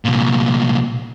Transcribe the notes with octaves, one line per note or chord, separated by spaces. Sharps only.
C2 A#2